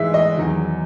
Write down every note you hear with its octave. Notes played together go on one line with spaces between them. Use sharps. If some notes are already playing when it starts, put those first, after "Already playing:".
Already playing: G#2 E3 G#3 E5
D#5
E2 D#3 F#3